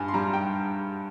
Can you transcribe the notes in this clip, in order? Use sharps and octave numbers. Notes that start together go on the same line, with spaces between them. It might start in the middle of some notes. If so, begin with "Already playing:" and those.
Already playing: G2 G#5
C6
G3 A#5
G5